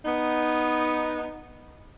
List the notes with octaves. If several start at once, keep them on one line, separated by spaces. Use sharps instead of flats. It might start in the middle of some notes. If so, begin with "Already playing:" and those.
B3 D#4